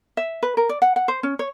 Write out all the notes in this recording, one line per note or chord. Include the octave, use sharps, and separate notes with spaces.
E5
B4
A#4
D5
F#5
F#5
C5
C#4
C#5